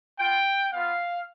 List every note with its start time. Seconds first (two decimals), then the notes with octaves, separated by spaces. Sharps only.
0.19 B3 F4 G5
0.73 B3 F4 F5